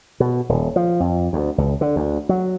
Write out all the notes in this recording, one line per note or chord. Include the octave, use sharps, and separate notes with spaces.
B2
D#1
F3
F2
D2
C#2
D3
D2
F#3